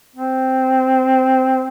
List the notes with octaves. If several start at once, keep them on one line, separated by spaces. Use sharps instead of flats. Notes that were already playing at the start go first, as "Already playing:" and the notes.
C4